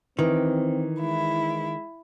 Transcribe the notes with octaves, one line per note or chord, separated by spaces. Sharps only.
D#3 E3 C4
G#3 E4